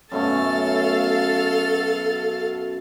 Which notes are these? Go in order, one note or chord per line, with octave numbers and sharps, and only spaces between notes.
F#2 B2 A3 A4 F5 A6